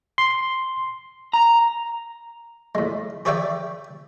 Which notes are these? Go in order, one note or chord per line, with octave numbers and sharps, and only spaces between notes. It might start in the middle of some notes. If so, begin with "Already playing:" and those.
C6
A#5
A2 G#3
G4 G#4 C#5 D5 E5 G5